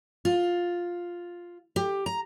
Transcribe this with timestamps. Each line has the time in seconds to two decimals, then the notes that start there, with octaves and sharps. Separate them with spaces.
0.25 F4
1.76 G4
2.06 A#5